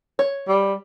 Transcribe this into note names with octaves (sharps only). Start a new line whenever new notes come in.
C#5
G3